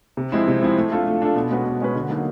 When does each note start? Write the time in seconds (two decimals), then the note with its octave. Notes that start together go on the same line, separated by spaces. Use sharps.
0.17 C3
0.32 F3 G#3 C4 E4
0.48 C3
0.62 F3 G#3 C4 E4
0.77 A3
0.92 D4 F4 A4
1.06 A3
1.22 D4 F4 A4
1.35 B2
1.51 G#3 C#4 F#4 B4
1.66 B2
1.81 G#3 C#4 F#4 B4
1.95 D3
2.10 F#3 A#3 D#4